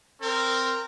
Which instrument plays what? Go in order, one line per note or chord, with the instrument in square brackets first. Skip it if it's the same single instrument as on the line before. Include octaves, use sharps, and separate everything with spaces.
[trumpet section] C4 A#4